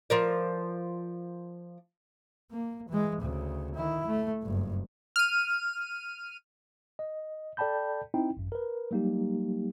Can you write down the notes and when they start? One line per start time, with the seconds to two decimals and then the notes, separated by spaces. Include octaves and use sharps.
0.10 F3 A#4 D5
2.51 A#3
2.89 E3 G#3
3.21 D2 C#3
3.75 D#3 E4
4.07 A3
4.42 F#1 G2
5.16 F6 D#7
6.99 D#5
7.57 A4 D5 G5 A5 B5 G6
8.14 C4 D#4 E4 G5
8.37 G#1 F#2
8.52 A#4 B4
8.91 F#3 G3 A#3 D#4 G4